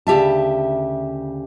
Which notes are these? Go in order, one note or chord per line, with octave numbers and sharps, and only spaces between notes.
D2 C#3 G4 E5 A5